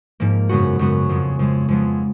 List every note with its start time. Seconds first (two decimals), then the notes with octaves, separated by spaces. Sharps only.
0.20 G#2 F3 A#3
0.49 F#2 C#3 G#3 B3 F#4
0.79 F#2 C#3 G#3 B3 F#4
1.09 F2 C#3 G#3
1.39 F2 C#3 G#3
1.69 F2 F3 G#3 B3